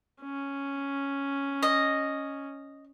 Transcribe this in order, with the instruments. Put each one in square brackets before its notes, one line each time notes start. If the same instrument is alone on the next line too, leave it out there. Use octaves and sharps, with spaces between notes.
[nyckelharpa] C#4
[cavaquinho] D#5